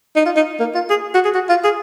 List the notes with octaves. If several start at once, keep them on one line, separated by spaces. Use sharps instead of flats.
D#4
F4
D#4
A#3
F4
G#4
F#4
G#4
F#4
F4
G#4